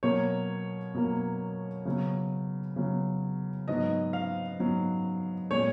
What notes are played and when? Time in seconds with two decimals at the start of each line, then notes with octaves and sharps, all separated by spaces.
0.03 B2 F#3 A#3 C#5
0.94 B2 F#3 A#3
1.85 C#3 F#3 B3
2.76 C#3 F#3 B3
3.68 G#2 F#3 B3 D#5
4.13 F5
4.59 G#2 F#3 B3
5.51 A#2 G#3 B3 C#5